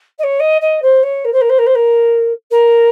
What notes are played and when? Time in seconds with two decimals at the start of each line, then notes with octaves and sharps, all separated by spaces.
0.18 D#5
0.23 C#5
0.39 D#5
0.61 D#5
0.82 C5
1.03 C#5
1.24 A#4
1.33 C5
1.41 A#4
1.49 C5
1.58 A#4
1.66 C5
1.75 A#4
2.51 A#4